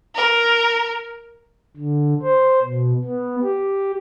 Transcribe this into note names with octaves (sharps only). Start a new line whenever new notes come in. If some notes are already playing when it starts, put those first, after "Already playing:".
A#4
D3
C5
B2
B3
G4